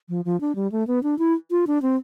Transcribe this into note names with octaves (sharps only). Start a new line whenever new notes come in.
F3
F3
D4
G3
A3
B3
D4
E4
F4
D4
C4